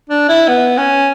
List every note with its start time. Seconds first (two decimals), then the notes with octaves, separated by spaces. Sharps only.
0.10 D4
0.28 E4
0.48 B3
0.77 C#4